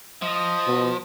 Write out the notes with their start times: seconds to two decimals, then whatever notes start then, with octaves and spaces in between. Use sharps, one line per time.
0.22 F3 D#5
0.67 B2